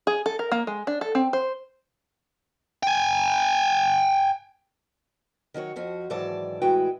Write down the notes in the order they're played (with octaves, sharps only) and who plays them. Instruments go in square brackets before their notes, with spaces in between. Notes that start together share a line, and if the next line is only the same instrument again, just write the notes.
[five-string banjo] G#4
A4
A#4
A#3
G#3
D4
A4
C4
C5
[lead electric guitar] G5 G#5
[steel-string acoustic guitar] D#3 F#3 F#4 C#5
F2 F3 F#4
G#2 D#3 E3 F#3 D5 A5
A2 E3 G#3 F#4 B4 G5